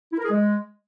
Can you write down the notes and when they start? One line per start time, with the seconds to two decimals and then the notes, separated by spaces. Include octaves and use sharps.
0.12 E4
0.18 A#4
0.24 G#4
0.31 G#3